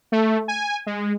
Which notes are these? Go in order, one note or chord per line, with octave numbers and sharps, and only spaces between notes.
A3
G#5
G#3